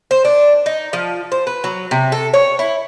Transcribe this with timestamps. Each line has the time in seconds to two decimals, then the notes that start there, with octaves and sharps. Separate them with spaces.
0.11 C5
0.25 D4
0.66 D#4
0.93 F3
1.32 C5
1.47 B4
1.64 F#3
1.91 C3
2.12 A4
2.34 C#5
2.59 E4